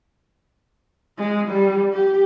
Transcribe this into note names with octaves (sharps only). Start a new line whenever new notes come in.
G#3
G3
G4